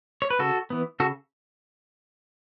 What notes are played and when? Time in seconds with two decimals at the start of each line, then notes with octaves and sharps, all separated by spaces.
0.22 C#5
0.30 B4
0.39 C#3 F#4 A4
0.70 E3 B3
1.00 C#3 F#4 A4